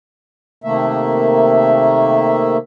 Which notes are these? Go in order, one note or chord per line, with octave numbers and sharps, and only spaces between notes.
C3 D#3 A3 A#3 E5